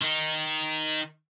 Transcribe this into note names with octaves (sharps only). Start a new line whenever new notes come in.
D#3 D#4